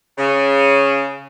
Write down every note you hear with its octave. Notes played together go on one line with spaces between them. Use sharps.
C#3